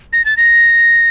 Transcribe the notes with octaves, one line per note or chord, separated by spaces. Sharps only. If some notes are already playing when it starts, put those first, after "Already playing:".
A#6
A6
A#6